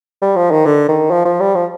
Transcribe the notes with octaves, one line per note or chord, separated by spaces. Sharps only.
G3
F3
D#3
D3
D#3
F3
F3
G3
F3